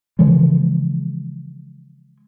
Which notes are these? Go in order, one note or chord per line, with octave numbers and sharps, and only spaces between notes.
C#3 E3 F3 G#3